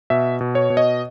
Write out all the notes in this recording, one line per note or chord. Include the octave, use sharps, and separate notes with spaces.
B2 E5
B2
C#5
B2
D#5